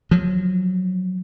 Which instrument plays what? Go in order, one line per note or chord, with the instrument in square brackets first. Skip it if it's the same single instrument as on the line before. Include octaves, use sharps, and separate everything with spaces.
[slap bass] F3 F#3